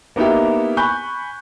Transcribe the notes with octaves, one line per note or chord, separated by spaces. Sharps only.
A#3 B3 D#4 E4 G4
G#5 B5 C#6 F#6 G6